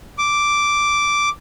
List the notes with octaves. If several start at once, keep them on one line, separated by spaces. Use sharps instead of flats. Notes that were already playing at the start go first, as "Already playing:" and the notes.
D6